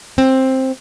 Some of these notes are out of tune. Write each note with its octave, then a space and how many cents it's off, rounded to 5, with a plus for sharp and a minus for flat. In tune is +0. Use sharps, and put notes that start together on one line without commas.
C4 +10